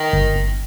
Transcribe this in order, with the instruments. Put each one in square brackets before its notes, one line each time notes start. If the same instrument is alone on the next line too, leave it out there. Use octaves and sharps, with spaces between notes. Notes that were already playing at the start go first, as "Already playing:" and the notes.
Already playing: [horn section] D#3
[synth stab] G1
G1